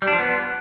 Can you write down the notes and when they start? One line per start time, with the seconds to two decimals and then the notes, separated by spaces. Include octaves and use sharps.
0.02 G3
0.07 D4
0.13 F3
0.18 B3